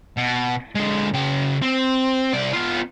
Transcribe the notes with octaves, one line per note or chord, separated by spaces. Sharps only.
B2
D3 G#3
C#3 G5
C4
C2 D5
B3 F4